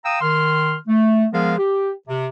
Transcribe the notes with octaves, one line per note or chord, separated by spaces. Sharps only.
F5 G5 A#5 D#6 E6
D#3 C6 F6
A3
F3 G#3 B3 G#4 A#4 F5
G4
C3